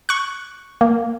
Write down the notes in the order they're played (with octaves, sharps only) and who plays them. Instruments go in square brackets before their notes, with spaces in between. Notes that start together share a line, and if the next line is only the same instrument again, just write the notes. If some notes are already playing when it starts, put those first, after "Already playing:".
[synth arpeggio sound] C#6 F#6
A#3